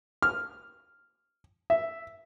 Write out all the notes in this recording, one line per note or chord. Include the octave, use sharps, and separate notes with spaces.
F6
E5